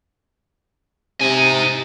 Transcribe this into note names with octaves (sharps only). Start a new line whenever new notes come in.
C3 D#4 G#5